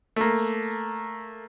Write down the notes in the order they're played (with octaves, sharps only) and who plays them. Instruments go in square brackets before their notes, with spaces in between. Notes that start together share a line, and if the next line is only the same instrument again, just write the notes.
[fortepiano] A3 A#3